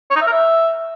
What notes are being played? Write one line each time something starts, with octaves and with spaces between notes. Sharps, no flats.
C#5
D#4
E5
A#4
E5